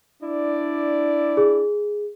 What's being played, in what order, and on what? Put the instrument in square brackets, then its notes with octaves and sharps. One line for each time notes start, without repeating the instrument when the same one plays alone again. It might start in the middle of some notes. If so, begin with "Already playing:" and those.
[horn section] D4 E4 D5
[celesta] G#4